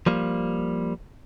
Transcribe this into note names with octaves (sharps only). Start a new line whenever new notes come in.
F3 G3 A#3